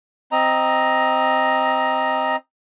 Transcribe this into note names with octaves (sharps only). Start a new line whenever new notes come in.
C4 D#5 A#5